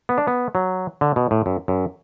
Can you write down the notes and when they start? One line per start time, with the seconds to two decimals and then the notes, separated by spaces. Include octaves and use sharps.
0.09 B3
0.18 D4
0.27 B3
0.55 F#3
1.01 D3
1.16 B2
1.31 A2
1.46 F#2
1.68 F#2